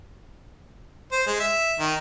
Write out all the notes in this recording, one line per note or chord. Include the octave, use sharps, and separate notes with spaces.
C5
G#3
E5
D#3